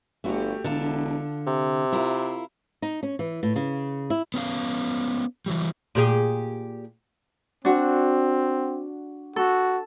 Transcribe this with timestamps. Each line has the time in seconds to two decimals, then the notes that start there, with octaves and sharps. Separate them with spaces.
0.24 G1 A3 F#4 G4
0.64 E1 D3 F4 A5
1.47 C3
1.92 E4 F4 A#4
2.82 D#4
3.03 C#4
3.19 E3
3.43 A2
3.56 C#3
4.10 E4
4.34 B3 C#4 G4 F5
5.46 E3 F#3 G3
5.95 A#2 G4 G#4
7.65 C4 D4 F#4
9.36 F#4 A4